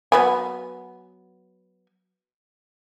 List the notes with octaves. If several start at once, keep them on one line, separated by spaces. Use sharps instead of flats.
F#3 B3 G#5